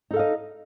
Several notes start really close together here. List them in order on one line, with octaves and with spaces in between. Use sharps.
D#4 A4 F5 D#5